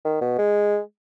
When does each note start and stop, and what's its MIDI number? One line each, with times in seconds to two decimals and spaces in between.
0.05 0.18 51
0.21 0.38 47
0.38 0.79 56